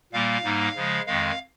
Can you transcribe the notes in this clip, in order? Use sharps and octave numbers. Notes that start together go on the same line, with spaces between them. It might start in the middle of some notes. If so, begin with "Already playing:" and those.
A#2 G3 A#3 F5
G#2 G3 A#3 D#4
C#3 F3 G#3
F2 D#3 G#3 F5